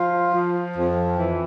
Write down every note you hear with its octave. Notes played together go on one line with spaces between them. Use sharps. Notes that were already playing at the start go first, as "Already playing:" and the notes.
Already playing: F3 F4
F3
F2
E3